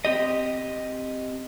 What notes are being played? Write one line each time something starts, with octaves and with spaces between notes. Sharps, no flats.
C4 G4 D#5